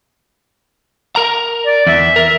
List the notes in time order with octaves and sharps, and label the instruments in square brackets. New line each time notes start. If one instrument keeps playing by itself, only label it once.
[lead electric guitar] A#4 A#5
[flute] D5
[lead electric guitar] E2 [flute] E5
[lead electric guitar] A#4